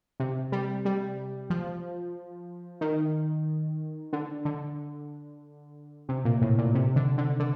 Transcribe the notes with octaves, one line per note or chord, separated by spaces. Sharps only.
C3
G3
G3
F3
D#3
D3
D3
C3
A#2
A2
A#2
C3
D3
D3
D3